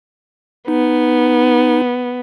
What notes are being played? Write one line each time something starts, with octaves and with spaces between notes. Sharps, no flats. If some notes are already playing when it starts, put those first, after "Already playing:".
B3 D#4